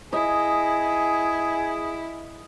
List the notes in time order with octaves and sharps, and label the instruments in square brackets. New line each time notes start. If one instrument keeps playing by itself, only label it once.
[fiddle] E4 [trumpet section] G#4 [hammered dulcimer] D#5